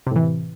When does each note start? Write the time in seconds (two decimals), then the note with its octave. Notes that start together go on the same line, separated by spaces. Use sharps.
0.07 C3
0.11 A2
0.16 E3